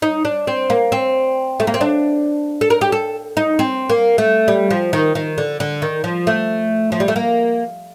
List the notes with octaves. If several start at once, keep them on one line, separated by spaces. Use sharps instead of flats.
D#4
D4
C4
A#3
C4
A3
A#3
C4
D4
A4
A#4
G4
A4
D#4
C4
A#3
A3
G3
F3
D#3
D#3
D3
D3
D#3
F3
A3
F3
G3
A3
A#3